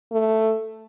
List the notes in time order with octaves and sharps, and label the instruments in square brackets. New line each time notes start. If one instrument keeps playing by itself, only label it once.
[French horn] A3